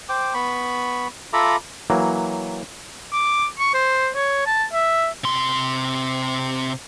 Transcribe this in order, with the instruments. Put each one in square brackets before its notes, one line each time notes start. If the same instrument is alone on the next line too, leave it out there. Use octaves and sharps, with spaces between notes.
[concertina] C5 G5 D6
B3 B5 C#6
F4 A4 E5 A#5 B5 D6
[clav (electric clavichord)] E3 F#3 A#3
[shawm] D6
C#6
C5
C#5
A5
E5
[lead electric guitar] C3 C6